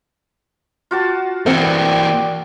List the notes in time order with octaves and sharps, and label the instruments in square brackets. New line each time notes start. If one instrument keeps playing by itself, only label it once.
[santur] F4 F#4 A5
[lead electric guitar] E3 A#3 [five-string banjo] C4 A#4 F#5 [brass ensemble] D5 G5